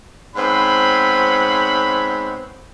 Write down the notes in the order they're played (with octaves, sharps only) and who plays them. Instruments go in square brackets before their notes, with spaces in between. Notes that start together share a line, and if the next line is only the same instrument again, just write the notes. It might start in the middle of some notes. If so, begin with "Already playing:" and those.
[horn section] G#2 B3 C4 C#5 B5